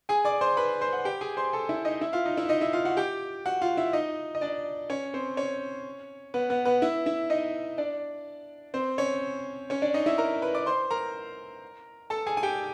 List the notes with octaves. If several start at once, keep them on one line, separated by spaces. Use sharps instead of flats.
G#4 G#5
D5 D6
C5 C6
B4 B5
C5 C6
F#5
G4 G5
G#4 G#5
C5 C6
A4 A5
E4 E5
D#4 D#5
E4 E5
F4 F5
D#4 D#5
E4 E5
D#4 D#5
E4 E5
F4 F5
F#4 F#5
G4 G5
F#4 F#5
F4 F5
E4 E5
D#4 D#5
D#5
D4 D5
C#4 C#5
C4 C5
C#4 C#5
B3 B4
B3 B4
B3 B4
E4 E5
E4 E5
D#4 D#5
D4 D5
C4 C5
C#4 C#5
C#4 C#5
D4 D5
D#4 D#5
E4 E5
A#4 A#5
B4 B5
D5 D6
C5 C6
A#4 A#5
A4 A5
G#4 G#5
G#5
G4 G5